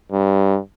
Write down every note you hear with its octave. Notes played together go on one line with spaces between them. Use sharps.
G2